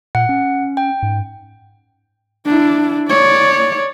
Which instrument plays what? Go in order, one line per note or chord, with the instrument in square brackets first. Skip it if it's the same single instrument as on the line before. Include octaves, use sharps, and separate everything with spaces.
[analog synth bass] A#2 [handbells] F#5
[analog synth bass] C#4
[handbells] G5
[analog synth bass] G#2
[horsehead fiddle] D4 E4
C#5 D5